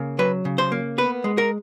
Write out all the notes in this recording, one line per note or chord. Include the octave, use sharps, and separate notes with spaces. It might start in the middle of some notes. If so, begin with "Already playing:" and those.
Already playing: C#3 A#3
F#3 B4
C#3
C5
A#3
B3 B4
G#3
A#4